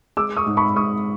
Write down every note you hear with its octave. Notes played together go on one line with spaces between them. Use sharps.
G#3 D6 E6
C#6 D#6
G#2
B5 C#6
G#2 C#6 D#6